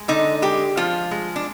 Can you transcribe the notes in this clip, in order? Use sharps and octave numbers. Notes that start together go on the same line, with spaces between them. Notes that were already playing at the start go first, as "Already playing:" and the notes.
Already playing: G#3
D3 D#4
G#3 G4
F3 F4
G#3
D4